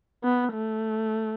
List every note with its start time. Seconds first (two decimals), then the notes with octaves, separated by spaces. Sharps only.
0.24 B3
0.53 A3